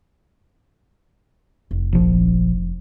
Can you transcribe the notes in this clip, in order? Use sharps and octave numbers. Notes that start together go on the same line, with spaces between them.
F1
A#1 F3